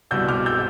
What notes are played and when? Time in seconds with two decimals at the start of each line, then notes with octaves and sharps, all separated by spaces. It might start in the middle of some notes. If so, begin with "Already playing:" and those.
0.11 C2 B2 G3 E6 G6
0.28 D6 F6
0.46 E6 G6